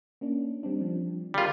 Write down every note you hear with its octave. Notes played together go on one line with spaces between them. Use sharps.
A#3 C#4 D4
G3 C4 D4
F3
D3 G3 F4 G#4 A#4